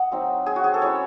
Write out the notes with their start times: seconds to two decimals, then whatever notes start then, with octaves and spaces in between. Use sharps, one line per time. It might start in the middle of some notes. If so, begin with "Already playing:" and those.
Already playing: D#5 F#5
0.11 F#3 C4 D#4
0.46 G#4
0.56 F#4
0.64 G#4
0.74 A4
0.82 G#3 C#4 E4 C#5